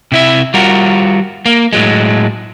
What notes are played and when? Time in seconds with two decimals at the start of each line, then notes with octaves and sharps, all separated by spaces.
0.12 C3 E4 E5
0.54 G3 F4 F#4 A#4
1.46 A#3
1.73 A2 F#3 G#3